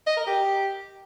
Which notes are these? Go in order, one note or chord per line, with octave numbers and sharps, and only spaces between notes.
D#5
A#4
G4